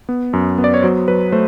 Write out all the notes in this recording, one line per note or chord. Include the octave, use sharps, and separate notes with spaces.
B3
F#2
B3
D5
C#5
F#3 C5
F#3 B4
A3 C5